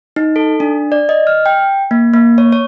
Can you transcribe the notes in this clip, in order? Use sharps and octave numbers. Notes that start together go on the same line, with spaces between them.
D#4
A4
D4
D5
D#5
F6
G5
A#3
A#3
C#5
C#5